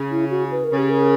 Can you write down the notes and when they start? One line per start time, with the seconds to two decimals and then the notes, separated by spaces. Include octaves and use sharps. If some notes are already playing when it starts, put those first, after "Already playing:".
Already playing: C#3
0.11 E4
0.30 F#4
0.51 B4
0.64 A#4
0.71 C#3
0.77 G4
0.90 A#4